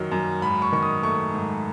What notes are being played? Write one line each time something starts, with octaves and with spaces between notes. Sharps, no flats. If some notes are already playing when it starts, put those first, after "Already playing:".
Already playing: F#2 D#3 F#3
F#2
G#2 B5
C#6
D#3 C#6
D#6
A3 C#6
G#2